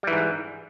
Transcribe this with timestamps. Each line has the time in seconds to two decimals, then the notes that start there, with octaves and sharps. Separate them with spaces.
0.03 G3
0.07 E3
0.12 G#2